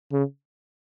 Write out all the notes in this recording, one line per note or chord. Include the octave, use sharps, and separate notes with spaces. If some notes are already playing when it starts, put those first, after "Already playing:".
C#3